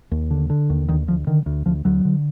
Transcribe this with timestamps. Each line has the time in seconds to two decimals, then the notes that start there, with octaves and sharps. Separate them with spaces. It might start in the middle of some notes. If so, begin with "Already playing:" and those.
0.11 D#2
0.31 D3
0.50 D3
0.70 D#2
0.88 D2 D#3
1.07 D2 F3
1.27 D3 D#3
1.46 D2
1.66 D2 F3
1.85 D2 F#3
2.05 D3